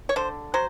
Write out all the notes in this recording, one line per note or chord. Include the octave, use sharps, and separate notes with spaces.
C#5
D3 C5
F#3 C5